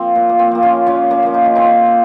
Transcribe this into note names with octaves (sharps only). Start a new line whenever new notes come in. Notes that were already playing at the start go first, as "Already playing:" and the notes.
Already playing: F3 A#3 C4
A#2
A#3
C4
F3 A#3
C#4 F4
A#2 C#4 F4
A#3 C#4
F3 A#3
D#4
F4
A#2 C4 D#4